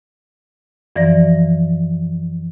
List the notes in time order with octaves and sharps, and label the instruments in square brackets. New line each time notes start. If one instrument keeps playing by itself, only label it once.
[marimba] F#2 E3 F3 D5 A#6